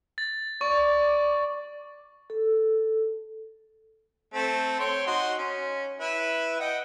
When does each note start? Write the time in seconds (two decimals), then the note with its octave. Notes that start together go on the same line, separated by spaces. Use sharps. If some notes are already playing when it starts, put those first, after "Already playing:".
0.18 A6
0.61 D5 C#6
2.30 A4
4.34 A3 C4
4.79 C#5 G5 C6
5.07 D#4 F#4 C6
5.38 C#4
6.00 E4 B4
6.60 D#5 F#5 G5